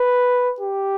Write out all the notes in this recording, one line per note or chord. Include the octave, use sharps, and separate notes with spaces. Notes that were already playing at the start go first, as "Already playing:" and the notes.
Already playing: B4
G4